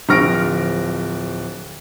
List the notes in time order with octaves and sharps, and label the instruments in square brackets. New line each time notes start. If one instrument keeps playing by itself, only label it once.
[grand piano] D1 F3 C#6 F6 A#6 D7